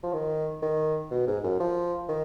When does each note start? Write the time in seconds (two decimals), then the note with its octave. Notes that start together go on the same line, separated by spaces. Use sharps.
0.03 F3
0.13 D#3
0.62 D#3
1.11 B2
1.27 G#2
1.44 F#2
1.60 F3
2.09 D#3